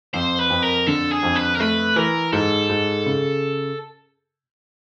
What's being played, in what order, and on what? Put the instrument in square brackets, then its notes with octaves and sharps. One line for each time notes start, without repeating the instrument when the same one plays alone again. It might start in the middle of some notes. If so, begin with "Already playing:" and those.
[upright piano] F2 [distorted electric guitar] C5
[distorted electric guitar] B4
[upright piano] F2
[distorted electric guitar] A#4
[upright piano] D3 [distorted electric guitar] A4
[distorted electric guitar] G#4
[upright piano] F2
[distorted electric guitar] B4
A#4
[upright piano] A3 [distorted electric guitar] B4
[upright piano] E3 [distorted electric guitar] A#4
[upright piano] G#2 [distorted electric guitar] A4
[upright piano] G#2
C#3